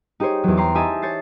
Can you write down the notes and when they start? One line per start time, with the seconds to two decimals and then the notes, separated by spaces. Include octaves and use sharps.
0.20 D#4 G4 G#4 C5 C#5
0.44 E2 F#3
0.57 G5 A#5 C6 D6
0.75 D#4 G4 D#5 E5 G#5 A5
1.02 C#5 G6 A6 C7